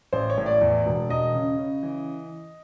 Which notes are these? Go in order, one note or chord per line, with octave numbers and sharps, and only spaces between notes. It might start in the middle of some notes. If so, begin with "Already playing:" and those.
A1 C5
C#5
A2
D5
E2
E1
E1 D#5
C#3
C#3
E3